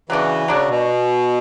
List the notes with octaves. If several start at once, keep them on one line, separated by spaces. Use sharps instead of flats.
C#3 E3 F#3 B3 D4 F#4
C#3 F#3 A#3 D4 F#4
B2